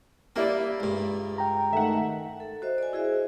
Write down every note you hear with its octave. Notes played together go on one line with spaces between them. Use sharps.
G3 A#3 E4 D5
C#2 G2
G5 A#5
D#3 A3 E5 F#5
A4
F#4 C5 D#5 E5
D5 G#5
E4 F#4 G#4 C5 D#5 E5